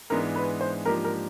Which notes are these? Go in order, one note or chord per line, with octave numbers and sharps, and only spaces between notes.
G#2 E3 G#3 B3 D4 A#4
B4
C5
G#2 F3 A#3 D4 G4 A#4
A#4